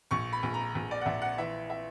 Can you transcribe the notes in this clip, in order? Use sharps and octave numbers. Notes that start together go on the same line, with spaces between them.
A#1 C#6
B5
A#1
A#5
A#1
D5
F#5
A#1 E5
F#5
E3 E5
E5